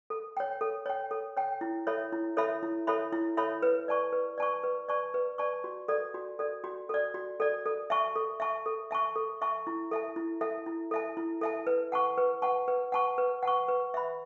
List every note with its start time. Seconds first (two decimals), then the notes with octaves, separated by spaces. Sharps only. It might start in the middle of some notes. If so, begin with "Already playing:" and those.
0.10 A4
0.37 C#5 G5
0.61 A4
0.86 C#5 G5
1.11 A4
1.37 C#5 G5
1.61 E4
1.87 A4 C#5 E5 B5
2.12 E4
2.37 A4 C#5 E5 B5
2.63 E4
2.87 A4 C#5 E5 B5
3.13 E4
3.37 A4 C#5 E5 B5
3.63 B4
3.88 D5 A5 C#6
4.12 B4
4.38 D5 A5 C#6
4.63 B4
4.88 D5 A5 C#6
5.14 B4
5.38 D5 A5 C#6
5.64 F#4
5.88 A4 D5
6.14 F#4
6.39 A4 D5
6.64 F#4
6.89 A4 D5
7.14 F#4
7.40 A4 D5
7.66 A4
7.90 E5 A5 C#6
8.16 A4
8.40 E5 A5 C#6
8.66 A4
8.91 E5 A5 C#6
9.16 A4
9.42 E5 A5 C#6
9.67 E4
9.92 A4 E5 A5
10.16 E4
10.41 A4 E5 A5
10.66 E4
10.91 A4 E5 A5
11.17 E4
11.41 A4 E5 A5
11.67 B4
11.92 F#5 A5 C#6
12.18 B4
12.42 F#5 A5 C#6
12.68 B4
12.92 F#5 A5 C#6
13.18 B4
13.43 F#5 A5 C#6
13.68 B4
13.94 E5 B5